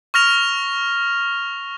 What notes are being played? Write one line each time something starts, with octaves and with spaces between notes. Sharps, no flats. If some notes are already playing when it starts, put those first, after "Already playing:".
C#6 F6 A#6 F7